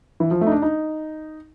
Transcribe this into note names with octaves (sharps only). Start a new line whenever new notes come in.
E3
F3
A3
D#4
D4
D#4